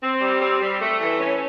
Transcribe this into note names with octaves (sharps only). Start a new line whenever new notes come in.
C4
G3
C4
G3
A3
E3
C#4